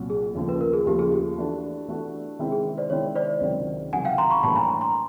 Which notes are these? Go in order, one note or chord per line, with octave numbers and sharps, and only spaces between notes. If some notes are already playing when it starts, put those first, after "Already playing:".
Already playing: C2 A#2 F#3
G#4
D#2 C#3 F3 A3
B4
A#4
G#4
D#2 C#3 F3 A3 G4
G#4
G4
E3 A3 D4 F#4
E3 A3 D4 F#4
C3 D#3 G#3 C4 E4
G#4
C5 D5
C3 D#3 G#3 C4 E4 C#5
C5 D5
C#2 C3 D#3 F#3
C#2 C3 D#3 F#3 F#5 G#5
F5 G5
A#5 C6
B5 C#6
A2 E3 G3 A#3 D4 A5 B5
G#5 A#5
A#5 C6